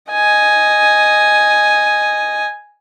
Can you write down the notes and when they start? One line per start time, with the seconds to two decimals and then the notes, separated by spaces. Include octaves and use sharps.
0.12 D#5 G#5